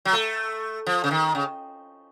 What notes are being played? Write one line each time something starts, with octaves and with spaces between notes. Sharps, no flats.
F#3
A3
F3
C#3
D#3
C#3